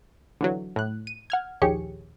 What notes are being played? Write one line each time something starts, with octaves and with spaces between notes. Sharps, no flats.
D3 E3 F#3
A2 F#6
D#7
F#5 F6 G#6
A#1 D#2 G4 G#4 C#5 C#7